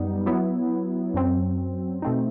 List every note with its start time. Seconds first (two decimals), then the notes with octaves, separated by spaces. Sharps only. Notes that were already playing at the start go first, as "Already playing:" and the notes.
Already playing: F#2 G3 B3 D#4
0.26 F#3 B3 E4
1.14 F#2 F#3 C4
2.02 B2 A3 C4 D#4